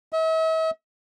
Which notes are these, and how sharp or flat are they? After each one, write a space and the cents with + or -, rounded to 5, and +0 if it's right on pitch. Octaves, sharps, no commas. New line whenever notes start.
E5 -45